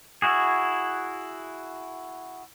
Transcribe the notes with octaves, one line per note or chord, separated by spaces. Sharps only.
E4 F#4 G#4